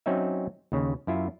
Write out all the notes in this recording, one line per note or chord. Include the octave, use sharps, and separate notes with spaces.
F#3 C4 C#4 D#4 E5
D#2 C#3
F#2 E4 F4